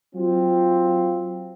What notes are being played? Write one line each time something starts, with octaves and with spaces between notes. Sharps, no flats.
F#3 C4 F4